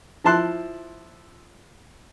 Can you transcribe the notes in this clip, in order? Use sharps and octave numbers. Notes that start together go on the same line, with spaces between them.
F3 E4 A5 C6 F#6